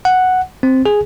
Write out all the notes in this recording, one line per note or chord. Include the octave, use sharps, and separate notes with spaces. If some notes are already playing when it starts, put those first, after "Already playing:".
F#5
C4
G#4